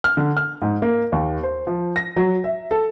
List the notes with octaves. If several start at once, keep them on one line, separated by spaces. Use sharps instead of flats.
F6
D3
F6
G#2
A#3
D#2
C5
F3
A#6
F#3
E5
A4